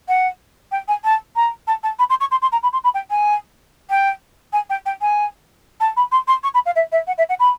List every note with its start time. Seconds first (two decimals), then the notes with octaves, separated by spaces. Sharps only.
0.08 F#5
0.71 G5
0.88 G#5
1.04 A5
1.36 A#5
1.67 A5
1.83 A5
1.99 B5
2.09 C6
2.20 C#6
2.31 C6
2.42 C6
2.52 A#5
2.63 B5
2.73 C6
2.84 B5
2.94 G5
3.10 G#5
3.90 G5
4.53 G#5
4.69 G5
4.86 G5
5.01 G#5
5.80 A5
5.96 B5
6.11 C6
6.27 C6
6.43 C#6
6.54 B5
6.66 F5
6.75 E5
6.92 E5
7.07 F#5
7.18 E5
7.29 F#5
7.39 B5